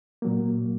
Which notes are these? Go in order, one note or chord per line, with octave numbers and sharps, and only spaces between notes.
A#2 F#3 A#3